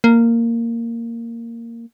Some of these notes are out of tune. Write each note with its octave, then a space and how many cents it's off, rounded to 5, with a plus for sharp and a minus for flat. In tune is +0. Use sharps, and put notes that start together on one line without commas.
A#3 -10